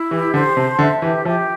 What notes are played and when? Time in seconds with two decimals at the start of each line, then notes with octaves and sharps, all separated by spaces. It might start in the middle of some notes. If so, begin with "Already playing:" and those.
Already playing: E4
0.10 E3 G4
0.34 D3 C5
0.56 C3 A5
0.79 D3 E5
1.02 E3 G4
1.25 F3 G4